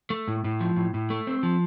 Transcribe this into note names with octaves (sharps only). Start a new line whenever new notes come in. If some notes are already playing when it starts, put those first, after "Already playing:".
A3
A2
A2
F3
A2
A2
A3
C4
F3